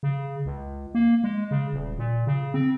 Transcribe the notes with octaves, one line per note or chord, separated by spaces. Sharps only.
C#3
C#2
A#3
G#3
C#3
D#1
A#2
C#3
C4